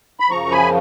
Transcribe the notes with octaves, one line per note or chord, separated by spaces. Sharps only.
B5
F#2 C#3 F3 A#5 C#6
G#5 B5